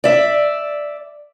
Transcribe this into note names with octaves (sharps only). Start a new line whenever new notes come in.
D5 E5